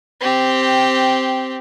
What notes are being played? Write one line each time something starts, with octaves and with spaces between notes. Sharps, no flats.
C4 G4